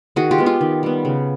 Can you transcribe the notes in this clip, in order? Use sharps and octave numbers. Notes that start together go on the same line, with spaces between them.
D#3 F#4 G#4
F4 G4
G#3 B3
F4 G4
D#3
G3 B3
C#3